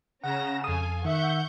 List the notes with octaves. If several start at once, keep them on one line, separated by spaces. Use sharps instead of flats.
C#3 C#4 F#5 A#5 A#6 E7
F2 A4 F5 G#5 D#6
D#3 E5 F#5 C#6 G6